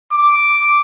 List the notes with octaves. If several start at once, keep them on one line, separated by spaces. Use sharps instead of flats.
D6